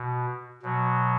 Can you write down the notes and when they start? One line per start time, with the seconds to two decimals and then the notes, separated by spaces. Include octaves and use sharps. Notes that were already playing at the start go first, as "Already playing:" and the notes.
Already playing: B2
0.62 B2 F#3